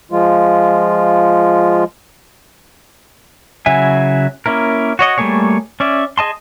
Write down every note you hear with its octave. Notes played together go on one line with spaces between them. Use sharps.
F3 G#3 F4
C#3 F#3 E4 E5 G#5
A#3 C#4 E4 A#4
F#4 C#5 D#5
G3 A3 A#3 G#4 C#5
C#4 D5 E5
G#4 D#5 A5 C6